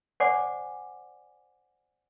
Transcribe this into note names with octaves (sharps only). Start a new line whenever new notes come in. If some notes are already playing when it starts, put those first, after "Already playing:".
C5 D5 F#5 G#5 D6